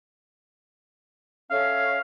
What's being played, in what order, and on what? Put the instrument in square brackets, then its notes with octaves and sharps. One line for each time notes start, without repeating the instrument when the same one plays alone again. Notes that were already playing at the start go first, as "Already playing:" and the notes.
[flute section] C#4 A4 E5 [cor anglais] F5